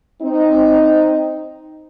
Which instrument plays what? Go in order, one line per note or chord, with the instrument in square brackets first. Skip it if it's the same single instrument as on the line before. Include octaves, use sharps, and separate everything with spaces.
[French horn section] C4 D#4